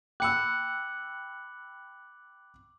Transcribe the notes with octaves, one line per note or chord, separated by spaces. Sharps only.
G5 B5 D6 E6 F#6 C#7 F#7